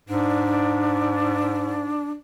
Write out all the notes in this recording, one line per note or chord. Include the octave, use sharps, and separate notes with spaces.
G#2 D4